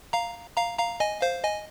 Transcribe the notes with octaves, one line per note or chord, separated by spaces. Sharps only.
F5 A#5
F5 A#5
F5 A#5
D#5 G#5
C5 F5
D#5 G#5